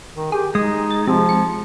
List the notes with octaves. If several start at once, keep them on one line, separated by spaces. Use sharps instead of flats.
D#3
G4 G#4
G#3 D#4 D#5
A6
C3 F3
C#7